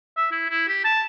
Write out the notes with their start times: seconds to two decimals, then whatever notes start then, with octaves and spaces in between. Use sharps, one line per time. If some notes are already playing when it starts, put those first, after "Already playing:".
0.17 E5
0.31 E4
0.49 E4
0.68 G4
0.84 A5